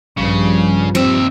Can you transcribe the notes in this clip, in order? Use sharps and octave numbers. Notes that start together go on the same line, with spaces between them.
A#1 G2 C#3 F3 G3
D#2 C4 E5